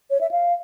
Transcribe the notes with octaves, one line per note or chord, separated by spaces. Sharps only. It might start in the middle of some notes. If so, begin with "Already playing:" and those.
C#5
E5
F5